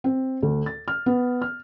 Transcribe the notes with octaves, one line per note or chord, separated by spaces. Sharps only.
C4
D2
A6
F6
B3
F6